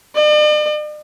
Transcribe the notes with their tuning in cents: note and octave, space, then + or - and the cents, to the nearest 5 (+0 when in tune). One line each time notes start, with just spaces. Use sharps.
D5 +45